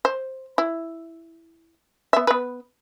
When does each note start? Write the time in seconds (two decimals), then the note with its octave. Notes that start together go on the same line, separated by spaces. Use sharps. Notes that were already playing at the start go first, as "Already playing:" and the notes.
0.05 C5
0.58 E4
2.13 B3 E5
2.27 B3 B4